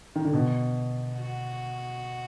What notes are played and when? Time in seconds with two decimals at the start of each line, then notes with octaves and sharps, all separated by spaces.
0.16 D#3
0.25 D3
0.33 B2
1.16 F#4